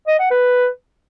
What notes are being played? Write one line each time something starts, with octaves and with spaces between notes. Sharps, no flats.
D#5
F#5
B4